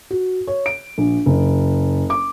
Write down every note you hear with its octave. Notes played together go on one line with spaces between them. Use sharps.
F#4
C#5
D7
A#1
F#1
D6